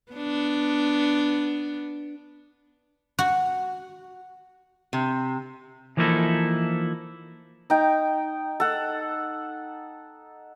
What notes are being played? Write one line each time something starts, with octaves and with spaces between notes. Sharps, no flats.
B3 D4
F#4
C3
E3 F3 A#3 D#4 E4 A4
D#4 G5
A4 F#5